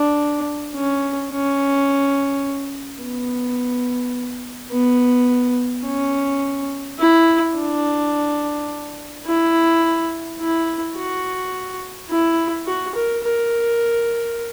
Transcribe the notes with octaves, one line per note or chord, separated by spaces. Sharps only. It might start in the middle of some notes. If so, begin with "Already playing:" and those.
Already playing: D4
C#4
C#4
B3
B3
C#4
E4
D4
E4
E4
F#4
E4
F#4
A#4
A#4